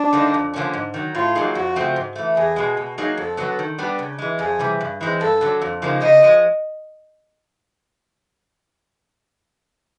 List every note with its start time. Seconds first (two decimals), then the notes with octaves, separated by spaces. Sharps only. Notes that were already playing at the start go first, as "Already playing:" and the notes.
Already playing: D4
0.13 D3 G3 A#3 D#4
0.34 F2
0.54 D3 F3 A#3 C#4
0.73 G#2
0.94 D#3 F#3
1.15 A2 F4
1.35 F#3 A#3 D#4 G#4
1.55 F2 F#4
1.76 C#3 F3 A3 C4
1.96 G#2
2.16 E3 A3
2.36 E2 G#4
2.56 B2 G#3
2.77 B2
2.98 F#3 A#3 D#4 G#4
3.17 F2 A4
3.37 D3 F#3 B3
3.59 D#3
3.78 G3 B3 D4 G4
3.99 C#3
4.19 E3 G#3
4.39 F2 G#4
4.59 C3 E3 G3
4.81 G2
5.01 E3 G#3 C4
5.21 G2 A4
5.41 D3 F#3
5.62 F2
5.82 C#3 F3 A#3 D#4
6.02 C#3 D#5
6.22 F3 G#3